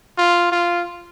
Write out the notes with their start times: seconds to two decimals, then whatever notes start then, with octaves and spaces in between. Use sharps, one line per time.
0.18 F4
0.52 F4